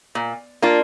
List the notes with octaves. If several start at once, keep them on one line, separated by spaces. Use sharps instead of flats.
A#2
A#3 D4 F4